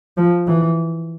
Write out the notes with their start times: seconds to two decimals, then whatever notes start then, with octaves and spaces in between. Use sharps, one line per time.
0.17 F3
0.47 E3